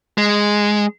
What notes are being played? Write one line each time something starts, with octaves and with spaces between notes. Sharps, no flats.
G#3